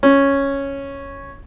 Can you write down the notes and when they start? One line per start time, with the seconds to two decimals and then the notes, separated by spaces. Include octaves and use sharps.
0.03 C#4